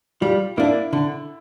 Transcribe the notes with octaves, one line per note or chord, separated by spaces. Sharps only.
G3 F4
A#3 D4 E4
D3